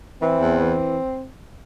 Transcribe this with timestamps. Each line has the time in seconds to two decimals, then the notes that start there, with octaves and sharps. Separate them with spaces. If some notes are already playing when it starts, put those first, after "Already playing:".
0.21 E3 C4
0.40 E2
0.60 E3